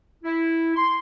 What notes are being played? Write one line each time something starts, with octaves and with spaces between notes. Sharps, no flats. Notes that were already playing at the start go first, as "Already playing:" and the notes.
E4
C6